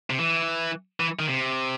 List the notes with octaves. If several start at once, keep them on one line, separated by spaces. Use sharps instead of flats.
C3
E3
E3
D#3
C3